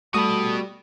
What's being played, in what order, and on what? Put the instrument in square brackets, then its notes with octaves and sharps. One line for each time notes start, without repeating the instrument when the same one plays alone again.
[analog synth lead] G3 [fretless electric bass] A3 [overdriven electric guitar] F#4 B5 [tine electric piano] A4 D#6